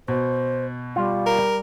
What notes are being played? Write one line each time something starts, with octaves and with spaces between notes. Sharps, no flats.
B2 C5
G3 F4
A#4